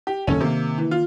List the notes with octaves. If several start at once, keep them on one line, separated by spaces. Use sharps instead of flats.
G4
F#1 D#2 C#4 A4 C#5
C3 D#3 A#3
E3
F4